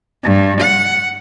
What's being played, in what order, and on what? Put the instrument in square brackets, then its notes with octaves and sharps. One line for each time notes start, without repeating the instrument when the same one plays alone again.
[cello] G2
F#5